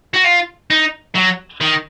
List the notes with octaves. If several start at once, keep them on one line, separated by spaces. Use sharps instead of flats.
F#4
F4
D#4
F#3
D#3